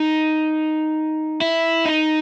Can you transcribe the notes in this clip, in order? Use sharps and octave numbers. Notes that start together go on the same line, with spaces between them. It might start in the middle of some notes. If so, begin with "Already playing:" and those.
Already playing: D#4
E4
D#4